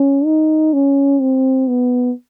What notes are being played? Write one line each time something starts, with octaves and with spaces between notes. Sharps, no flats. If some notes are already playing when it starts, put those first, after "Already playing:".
Already playing: C#4
D#4
C#4
C4
B3